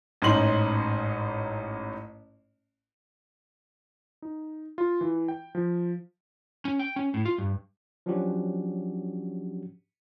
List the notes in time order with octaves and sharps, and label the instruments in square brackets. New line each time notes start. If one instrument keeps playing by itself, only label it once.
[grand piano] A1 G#2 C#4 D#4 C6 F#7
[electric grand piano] D#4
F4
E3
G5
F3
[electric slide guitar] C#4
G5
C#4
A2
F4
G2
[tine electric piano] F3 F#3 C#4 D4 F#4 G4